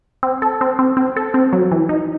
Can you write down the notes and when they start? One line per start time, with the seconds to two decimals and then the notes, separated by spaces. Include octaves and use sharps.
0.23 C4
0.42 A4
0.61 C4
0.79 C4
0.97 C4
1.16 A4
1.34 C4
1.53 F#3
1.72 E3
1.89 D#4